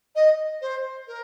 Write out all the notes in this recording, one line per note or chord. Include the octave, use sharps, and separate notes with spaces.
D#5
C5
A#4